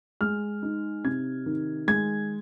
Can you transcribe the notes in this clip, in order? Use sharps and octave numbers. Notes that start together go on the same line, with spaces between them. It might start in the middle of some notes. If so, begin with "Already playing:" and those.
G#3 F6
D#4
C3 G#6
D#3
G#3 G#6